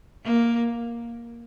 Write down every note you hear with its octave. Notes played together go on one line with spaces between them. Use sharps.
A#3